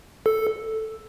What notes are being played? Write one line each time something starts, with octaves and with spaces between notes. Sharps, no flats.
A4